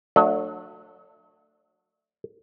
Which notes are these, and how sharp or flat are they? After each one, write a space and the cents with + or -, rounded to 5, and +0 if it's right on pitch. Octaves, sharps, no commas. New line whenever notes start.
F#3 -20 A3 +20 D4 +25